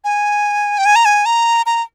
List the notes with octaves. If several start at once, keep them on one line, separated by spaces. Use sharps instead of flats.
G#5
G5
G#5
A#5
G#5
A#5
A#5